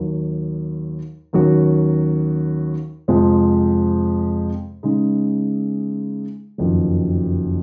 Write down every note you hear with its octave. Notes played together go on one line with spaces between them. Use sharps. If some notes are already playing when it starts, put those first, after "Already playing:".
Already playing: D#2 D#3 F#3
D#2 D#3 F#3 C#4 F#4
F2 C3 F3 G#3 C4
C#3 G#3 D#4
F#1 F2 D#3 F#3